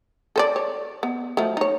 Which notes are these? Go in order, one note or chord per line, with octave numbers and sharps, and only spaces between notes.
A4 C5 D5
C#5
B3
F3 F#3 A3
D#4 C#5